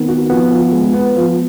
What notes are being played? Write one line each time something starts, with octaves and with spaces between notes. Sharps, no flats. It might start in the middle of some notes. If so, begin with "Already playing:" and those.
Already playing: D#3 B3 C4
F#4
F3 B3
F3
G#3
B3
F3